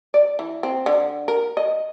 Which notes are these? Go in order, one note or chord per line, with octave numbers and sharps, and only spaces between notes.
D5
E3
C4
D3
A#4
D#5